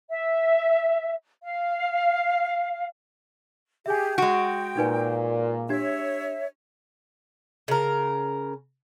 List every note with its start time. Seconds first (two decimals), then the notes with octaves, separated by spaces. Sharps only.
0.10 E5
1.43 F5
3.86 G4 G#4 E5 G#5
4.18 G#3 F#4 G5 D7
4.77 A#2 D#4 B4 G#5
5.69 D4 G4 C#5 E5 G#6
7.68 C#3 A#4